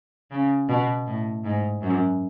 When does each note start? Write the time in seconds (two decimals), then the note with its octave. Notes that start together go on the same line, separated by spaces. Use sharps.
0.31 C#3
0.69 B2
1.07 A2
1.45 G#2
1.82 F#2